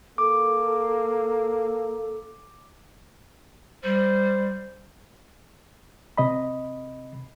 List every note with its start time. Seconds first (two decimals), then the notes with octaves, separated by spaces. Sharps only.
0.18 A#3 A4 D6
3.84 G3 C5
6.17 C3 D#5 B5